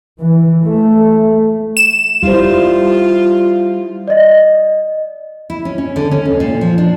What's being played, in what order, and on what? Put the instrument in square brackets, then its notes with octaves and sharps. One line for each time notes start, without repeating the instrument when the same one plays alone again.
[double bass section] E3
A3
[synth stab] E7
[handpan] G3 E4 C5 [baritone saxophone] F4
[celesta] D5 D#5
[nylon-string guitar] E4
C#4
C#4
D3
C#4
D#2
A#2
F3
D4